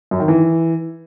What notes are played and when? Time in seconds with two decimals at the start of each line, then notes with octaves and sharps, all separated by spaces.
0.11 F#2
0.20 D#3
0.28 E3